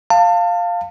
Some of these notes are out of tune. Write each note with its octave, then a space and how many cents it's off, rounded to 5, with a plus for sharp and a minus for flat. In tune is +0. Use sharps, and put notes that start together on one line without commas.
F5 +0 A5 +30